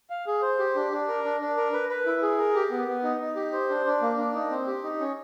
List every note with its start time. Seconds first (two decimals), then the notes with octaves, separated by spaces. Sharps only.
0.10 F5
0.27 G#4
0.42 C5
0.59 G4
0.75 D4
0.92 D4
1.08 A#4
1.24 D4
1.40 D4
1.57 A#4
1.73 B4
1.89 B4
2.06 E4
2.22 G#4
2.38 A#4
2.55 G4
2.71 B3
2.88 B3
3.03 D#4
3.21 D#4
3.36 G4
3.53 C5
3.69 D4
3.86 D4
4.02 A#3
4.18 D4
4.34 D#4
4.51 C4
4.67 G4
4.84 D#4
5.00 C#4